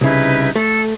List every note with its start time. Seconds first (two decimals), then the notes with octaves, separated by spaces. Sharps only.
0.01 C2 C#3 D#4 E4 B4
0.56 A3 A4